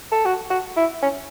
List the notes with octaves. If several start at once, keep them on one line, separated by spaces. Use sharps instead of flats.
A4
F#4
F#4
E4
C#4